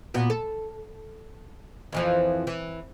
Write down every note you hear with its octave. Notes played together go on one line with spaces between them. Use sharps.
A#2 B3 F#4
A4
F2 E3 F3
E3